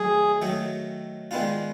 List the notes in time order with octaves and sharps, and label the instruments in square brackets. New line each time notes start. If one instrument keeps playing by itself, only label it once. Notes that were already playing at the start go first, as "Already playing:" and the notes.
Already playing: [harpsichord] D#3 F#3 A3 [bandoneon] G#4
[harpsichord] D#3 F#3 A3
D#3 G#3 B3 D4 F4